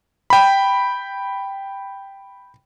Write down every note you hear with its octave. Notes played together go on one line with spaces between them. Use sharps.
G5 B5